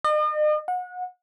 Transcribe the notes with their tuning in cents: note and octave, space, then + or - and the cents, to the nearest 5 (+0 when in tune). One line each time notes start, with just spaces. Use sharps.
D#5 -40
F#5 -30